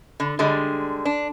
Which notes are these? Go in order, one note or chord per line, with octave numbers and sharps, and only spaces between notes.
D3
D3 G3 G#3
D4